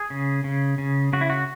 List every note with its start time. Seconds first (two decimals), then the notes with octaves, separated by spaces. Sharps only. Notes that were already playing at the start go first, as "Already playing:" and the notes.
Already playing: G#4
0.10 C#3
0.44 C#3
0.78 C#3
1.13 C#3 F#4
1.21 E4
1.30 F#4